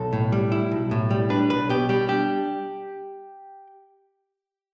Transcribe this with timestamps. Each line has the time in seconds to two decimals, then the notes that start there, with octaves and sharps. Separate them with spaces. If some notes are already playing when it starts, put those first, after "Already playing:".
Already playing: B1 A4
0.13 A2
0.32 G3
0.52 E4
0.72 B1
0.91 A2
1.11 G3
1.30 D4 B4
1.50 B1 B4
1.69 B2 G4
1.89 G3 G4
2.09 D4 G4